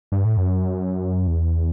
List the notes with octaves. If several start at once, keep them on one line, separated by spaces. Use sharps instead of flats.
G2
A2
F#2
E2